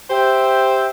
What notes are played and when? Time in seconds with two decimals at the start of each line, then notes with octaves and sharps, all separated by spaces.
0.10 G4 C5 E5 G5